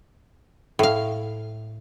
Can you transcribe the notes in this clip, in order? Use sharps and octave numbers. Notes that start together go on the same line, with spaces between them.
A2 F5